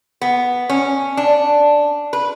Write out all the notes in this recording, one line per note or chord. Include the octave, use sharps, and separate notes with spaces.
B3
C#4
D4
B4